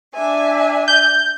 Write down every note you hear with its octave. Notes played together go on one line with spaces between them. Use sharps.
D4 E5 G#5
G6